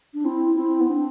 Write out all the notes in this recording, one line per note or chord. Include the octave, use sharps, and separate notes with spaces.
D4
C4 E4
C4 E4
B3
C4 D4